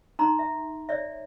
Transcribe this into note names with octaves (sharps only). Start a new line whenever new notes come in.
D#4 A#5 C6
E5
C#5 D5 E5